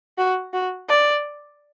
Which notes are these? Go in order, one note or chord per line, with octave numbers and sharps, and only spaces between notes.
F#4
F#4
D5